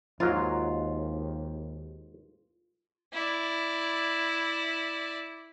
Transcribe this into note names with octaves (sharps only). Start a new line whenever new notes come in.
D#2 G#2 F#3 F4 A#4
E4 D5